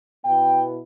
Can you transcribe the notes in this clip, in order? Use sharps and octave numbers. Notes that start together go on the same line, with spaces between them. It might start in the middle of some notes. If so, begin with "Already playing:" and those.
B2 B3 E4 G5